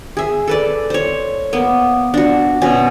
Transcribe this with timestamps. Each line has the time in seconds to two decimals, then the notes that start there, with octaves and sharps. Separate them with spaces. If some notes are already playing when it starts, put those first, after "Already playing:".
0.17 G#4 E5
0.47 A4 B4 D5
0.90 C5 C#5
1.53 A#3 B3
2.14 D4 F#4
2.62 B2 C#4